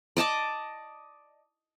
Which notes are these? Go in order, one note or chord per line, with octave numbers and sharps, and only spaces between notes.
D5 D#5 A5 D6